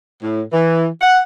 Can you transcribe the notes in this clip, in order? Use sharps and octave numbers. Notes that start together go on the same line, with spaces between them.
A2
E3
F#5